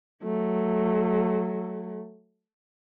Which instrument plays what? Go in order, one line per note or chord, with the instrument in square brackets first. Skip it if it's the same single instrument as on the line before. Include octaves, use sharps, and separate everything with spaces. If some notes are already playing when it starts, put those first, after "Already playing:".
[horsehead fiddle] F#3 A3